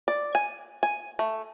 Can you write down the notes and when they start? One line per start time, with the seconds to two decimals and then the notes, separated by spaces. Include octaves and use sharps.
0.08 D5
0.35 G#5
0.83 G#5
1.19 A3